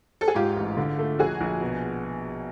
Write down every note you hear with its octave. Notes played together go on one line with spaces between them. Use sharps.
A4
G#4
G#2 F4 G4
A1
D3
A3
A#1 F#4 G#4
A#1
B2